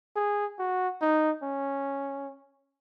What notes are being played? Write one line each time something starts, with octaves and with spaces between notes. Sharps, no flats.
G#4
F#4
D#4
C#4